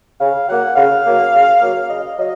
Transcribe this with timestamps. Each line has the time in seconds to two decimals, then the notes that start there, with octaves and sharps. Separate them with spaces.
0.19 C#3 F5
0.48 F#3 A#3 F#5
0.76 C#3 F5
1.04 F#3 A#3
1.33 C#3
1.61 F#3 A#3
1.90 C#3 D#5
2.18 F#3 D#5